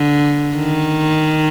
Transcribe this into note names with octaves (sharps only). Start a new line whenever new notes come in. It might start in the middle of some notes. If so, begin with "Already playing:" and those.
Already playing: D3
D#3